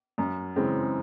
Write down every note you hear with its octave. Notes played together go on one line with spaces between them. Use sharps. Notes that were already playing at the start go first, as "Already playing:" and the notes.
F#2
C#3 E3 G#3 C4